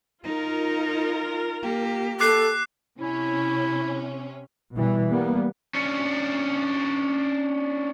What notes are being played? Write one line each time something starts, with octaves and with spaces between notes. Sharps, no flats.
D#4 F4 A#4
A#3 G4
A4 D6 F#6 C7
C3 C#4 E4
B2 E3 G3
G3 A#3 B3
C#4 D4